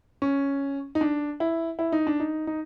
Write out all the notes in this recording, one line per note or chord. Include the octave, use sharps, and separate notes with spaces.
C#4
D#4
D4
E4
E4
D#4
D4
D#4
D#4